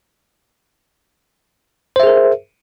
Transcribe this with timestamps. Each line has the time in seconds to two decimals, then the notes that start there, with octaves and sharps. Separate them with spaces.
1.96 C5
2.00 E5
2.03 G#4
2.07 A#4